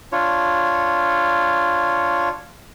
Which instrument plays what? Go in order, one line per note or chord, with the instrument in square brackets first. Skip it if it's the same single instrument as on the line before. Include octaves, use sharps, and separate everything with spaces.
[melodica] D4 F4 C#5